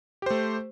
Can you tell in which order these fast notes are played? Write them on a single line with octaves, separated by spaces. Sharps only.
G4 C5 A3